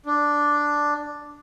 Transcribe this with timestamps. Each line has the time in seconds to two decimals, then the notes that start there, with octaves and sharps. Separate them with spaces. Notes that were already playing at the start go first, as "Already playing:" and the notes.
0.06 D4